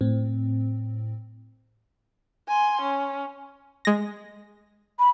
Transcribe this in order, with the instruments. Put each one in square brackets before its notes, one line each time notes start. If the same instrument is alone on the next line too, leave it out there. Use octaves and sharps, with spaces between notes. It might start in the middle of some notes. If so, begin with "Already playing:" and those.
[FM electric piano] A2 C4
[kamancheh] G#5 C6
C#4
[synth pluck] G#3 A#6
[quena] B5